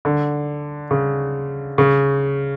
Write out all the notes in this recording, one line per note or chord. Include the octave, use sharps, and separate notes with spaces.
D3
C#3
C#3